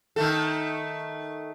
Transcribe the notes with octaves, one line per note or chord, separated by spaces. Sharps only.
D#3 A3 A4